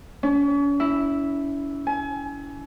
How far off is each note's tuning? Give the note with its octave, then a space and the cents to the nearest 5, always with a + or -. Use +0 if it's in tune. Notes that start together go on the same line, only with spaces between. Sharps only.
C#4 +40
E4 -5
G#5 +35